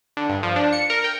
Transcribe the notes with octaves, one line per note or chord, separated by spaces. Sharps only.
D3
G2
F3
D4
C#7
A#4
G5